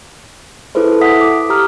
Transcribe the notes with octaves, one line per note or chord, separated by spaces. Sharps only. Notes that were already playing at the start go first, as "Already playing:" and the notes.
E4 G#4 A4 B4 C5
E4 A4
E5 F#5 D#6 B6
D6
G4 A#5 D#6 F6